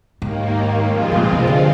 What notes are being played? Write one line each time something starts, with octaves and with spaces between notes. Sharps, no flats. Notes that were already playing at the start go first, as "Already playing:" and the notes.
D#2 G#2 D#3 A#3
G2 F3 G#3 C4 F4
C3
A#2
C3
D3